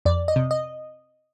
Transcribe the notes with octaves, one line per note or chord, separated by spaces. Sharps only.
F2 D5
D#5
C3
D#5